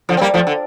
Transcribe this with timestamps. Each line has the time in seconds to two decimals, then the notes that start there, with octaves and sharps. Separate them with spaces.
0.09 D3 F3
0.17 C4
0.21 G3 A#3
0.34 F3 A3
0.47 D3